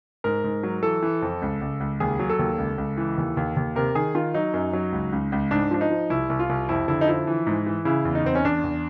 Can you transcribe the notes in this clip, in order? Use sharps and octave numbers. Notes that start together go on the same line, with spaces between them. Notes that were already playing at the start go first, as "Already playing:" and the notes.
G#2 A#4
G#2
F#3
E3 A4
E3
F2
C#2
C#2
C#2
D#2 G#4
F#3
A4
D#2
C#2
C#2
E3
D#2
D#2
D#2
C3 A#4
D#3 G#4
D#3 F4
F#3 D#4
F#2
F#3
C#2
C#2
C#2
G#2 D4
F3 D4
D#4
F3
C2 E4
C2
F4
C2
F2 E4
D3 E4
D#4
F3 E4
E3
G#2
E3
C#3 E4
E2
D#4
E2 C4
C#4
E2 D4
E2